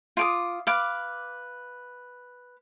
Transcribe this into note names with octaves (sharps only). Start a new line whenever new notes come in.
F4 D6 D#6
B4 F5 D6